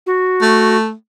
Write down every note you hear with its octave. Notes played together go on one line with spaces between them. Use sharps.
F#4
A3